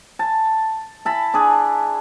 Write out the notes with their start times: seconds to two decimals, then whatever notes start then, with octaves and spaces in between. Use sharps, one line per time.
0.19 A5
1.05 E4 A5 B5
1.34 D4 G#4